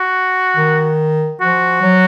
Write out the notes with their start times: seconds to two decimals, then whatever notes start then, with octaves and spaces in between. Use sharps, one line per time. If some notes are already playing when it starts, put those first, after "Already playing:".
Already playing: F#4
0.57 D#3
1.41 F3 F#4
1.82 F#3